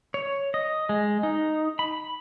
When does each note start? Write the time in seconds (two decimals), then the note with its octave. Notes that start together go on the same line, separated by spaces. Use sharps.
0.14 C#5
0.54 D#5
0.89 G#3
1.23 D#4
1.79 B5